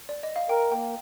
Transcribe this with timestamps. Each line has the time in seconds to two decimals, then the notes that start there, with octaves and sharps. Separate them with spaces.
0.09 D5
0.23 D#5
0.36 F5
0.49 A#4 G5
0.71 A#3 G5